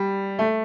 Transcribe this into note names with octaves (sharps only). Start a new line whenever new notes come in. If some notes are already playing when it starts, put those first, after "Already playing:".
Already playing: G3
A3